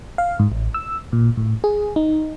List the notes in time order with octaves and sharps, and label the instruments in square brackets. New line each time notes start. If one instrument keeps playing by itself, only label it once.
[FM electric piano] F5
G#2
A1
E6
A#2
A2
G#4
D#4